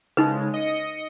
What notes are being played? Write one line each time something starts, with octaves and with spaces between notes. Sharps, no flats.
C#3 G#3 D#4 B4
D#5 C#7